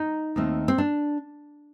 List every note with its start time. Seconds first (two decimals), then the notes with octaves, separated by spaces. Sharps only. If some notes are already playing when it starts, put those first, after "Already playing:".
Already playing: D#4
0.36 D#2 D#3 A3 C4
0.68 C4
0.78 D4